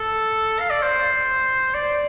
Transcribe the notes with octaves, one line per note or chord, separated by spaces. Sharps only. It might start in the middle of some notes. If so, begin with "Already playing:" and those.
Already playing: A4
F5
D5
C5
D5